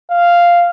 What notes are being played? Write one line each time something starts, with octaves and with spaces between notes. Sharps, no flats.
F5